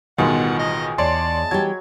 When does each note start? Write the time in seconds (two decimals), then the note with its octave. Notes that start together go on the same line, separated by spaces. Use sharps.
0.18 A1 B2 D#3 G3 G#3 B3 F4 F#5
0.59 D#5
0.98 E2 C#5 D5 A5 C6
1.51 E3 F#3 G3 G4 G#6